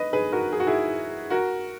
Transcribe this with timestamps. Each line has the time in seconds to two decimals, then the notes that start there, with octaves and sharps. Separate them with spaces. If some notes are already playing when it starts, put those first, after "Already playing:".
Already playing: B4 D#5
0.13 G#4 B4
0.33 F#4 A#4
0.52 G#4
0.60 F#4
0.67 E4 G#4
1.30 F#4 A#4